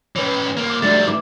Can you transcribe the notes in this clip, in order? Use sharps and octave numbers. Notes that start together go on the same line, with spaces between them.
E3 C#4 B4 C#5
C2 A#3
D6
F#3 G3 A3 D4 A6
E3 E4 D6